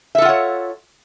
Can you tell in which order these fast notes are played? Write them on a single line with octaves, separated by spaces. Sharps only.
E5 A4 F4 F#5 C#5